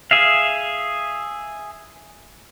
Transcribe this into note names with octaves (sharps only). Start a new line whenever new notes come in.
G#4 E5 F5